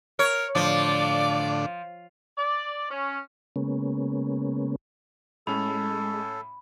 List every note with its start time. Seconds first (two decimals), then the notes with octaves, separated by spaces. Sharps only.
0.19 A#4 C#5
0.55 A2 D3 F3 D4 D5
2.38 D5
2.91 C#4
3.56 C#3 G#3 A#3 B3 C#4
5.47 A2 G#3 C#4 A4 B5